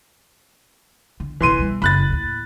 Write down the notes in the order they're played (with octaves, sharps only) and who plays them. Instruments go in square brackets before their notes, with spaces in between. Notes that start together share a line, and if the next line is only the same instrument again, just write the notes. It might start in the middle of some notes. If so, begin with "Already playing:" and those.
[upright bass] D3
[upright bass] D#1 B2 [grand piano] E3 C6 D#7
[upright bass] B2 G3
[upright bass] F#1 [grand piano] B5 F#6 A6
[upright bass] D#2 A2